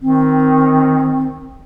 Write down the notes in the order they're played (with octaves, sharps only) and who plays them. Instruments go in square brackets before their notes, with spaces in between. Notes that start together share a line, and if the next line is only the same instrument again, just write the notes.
[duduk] D#3 [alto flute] C4